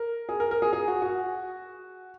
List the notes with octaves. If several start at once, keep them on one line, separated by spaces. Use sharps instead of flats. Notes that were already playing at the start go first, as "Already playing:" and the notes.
Already playing: A#4
G#4
A#4
A#4
G#4
G#4
F#4
F#4